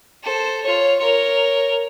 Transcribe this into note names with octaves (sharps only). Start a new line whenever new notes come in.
A4 C5
F4 C#5
A#4 C#5